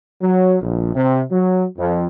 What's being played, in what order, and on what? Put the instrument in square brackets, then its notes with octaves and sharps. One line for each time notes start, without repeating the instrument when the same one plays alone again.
[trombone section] F#3
A#1
C3
F#3
F2